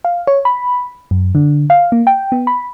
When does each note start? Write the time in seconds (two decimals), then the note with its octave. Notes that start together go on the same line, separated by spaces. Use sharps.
0.05 F5
0.27 C#5
0.45 B5
1.11 F#2
1.35 D3
1.70 F5
1.92 A#3
2.07 G5
2.32 B3
2.47 B5